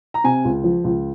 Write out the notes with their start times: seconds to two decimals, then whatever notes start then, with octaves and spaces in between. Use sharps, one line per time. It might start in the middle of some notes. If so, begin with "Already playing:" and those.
0.14 A#5
0.24 C3 G#5
0.45 C#2
0.64 F3
0.84 C#2